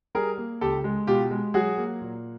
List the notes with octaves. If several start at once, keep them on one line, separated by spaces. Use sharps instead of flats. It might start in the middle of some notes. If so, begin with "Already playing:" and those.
G3 G#4 A#4
A#3
C#2 G4 A4
G#3
B2 F4 G4
G#3
F#3 F#4 G#4
A#3
A#2